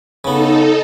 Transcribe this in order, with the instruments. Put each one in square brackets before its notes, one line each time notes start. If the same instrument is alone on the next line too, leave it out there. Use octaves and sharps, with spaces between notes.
[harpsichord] C#3 B3 [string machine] D#4 A4